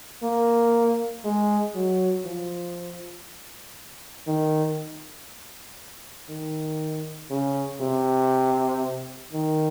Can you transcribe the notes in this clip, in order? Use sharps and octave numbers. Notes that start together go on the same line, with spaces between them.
A#3
G#3
F#3
F3
D#3
D#3
C#3
C3
D#3